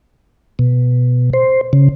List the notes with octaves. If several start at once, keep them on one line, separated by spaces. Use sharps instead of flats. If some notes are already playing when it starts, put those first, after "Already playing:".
B2
C5
C#3